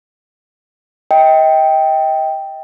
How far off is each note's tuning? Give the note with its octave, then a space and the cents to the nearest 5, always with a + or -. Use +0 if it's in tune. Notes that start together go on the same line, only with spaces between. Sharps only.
D#5 +35 G5 +0